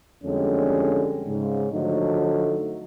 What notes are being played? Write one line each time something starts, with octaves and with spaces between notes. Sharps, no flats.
F2 D3 G3 G#3 C#4
G#2 C#3
D3 F3 F#3 A3 D#4